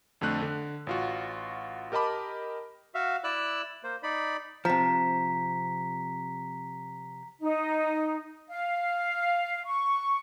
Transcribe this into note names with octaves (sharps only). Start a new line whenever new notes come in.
F2 D3 A3 F#6
D3
A1 F4 F#4
G4 A#4 D#5 A5 B5 D6
F#4 E5 F5
E4 D5 E6 F#6
A#3 C5
D#4 D5 B5
C3 F3 A#5 B6
D#4
F5
C#6